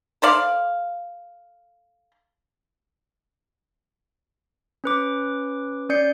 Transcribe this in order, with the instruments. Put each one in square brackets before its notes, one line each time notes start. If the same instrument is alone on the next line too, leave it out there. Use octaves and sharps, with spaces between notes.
[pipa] A4 C5 D5 F5
[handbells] C#4 B4 D6
C#4 D5 G6 C7 C#7